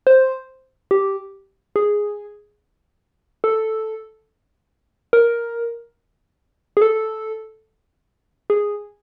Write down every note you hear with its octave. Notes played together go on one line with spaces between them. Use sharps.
C5
G4
G#4
A4
A#4
G#4
A4
G#4